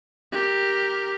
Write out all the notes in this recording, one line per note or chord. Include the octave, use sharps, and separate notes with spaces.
G4 A#4